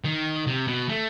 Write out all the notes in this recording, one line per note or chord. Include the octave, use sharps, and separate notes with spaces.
D#3
C3
B2
A3